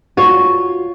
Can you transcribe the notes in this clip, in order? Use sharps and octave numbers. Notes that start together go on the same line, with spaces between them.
F4 F#4 C#5